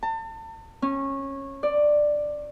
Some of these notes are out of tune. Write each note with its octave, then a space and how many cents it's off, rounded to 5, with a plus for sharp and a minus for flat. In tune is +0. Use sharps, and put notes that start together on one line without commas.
A5 +35
C#4 -20
D5 +10